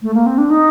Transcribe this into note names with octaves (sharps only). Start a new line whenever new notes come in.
A3
A#3
C4
D4
D#4